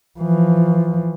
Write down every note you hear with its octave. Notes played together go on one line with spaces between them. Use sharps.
E3 F3